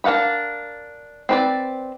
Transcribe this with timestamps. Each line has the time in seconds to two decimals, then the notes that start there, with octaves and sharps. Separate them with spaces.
0.04 D4 A#4 F5 F#5 B5
1.29 C4 B4 D5